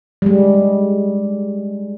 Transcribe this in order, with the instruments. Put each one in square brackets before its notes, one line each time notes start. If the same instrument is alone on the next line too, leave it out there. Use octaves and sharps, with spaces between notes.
[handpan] G3 G#3